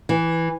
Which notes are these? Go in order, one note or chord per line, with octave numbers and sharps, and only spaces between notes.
E3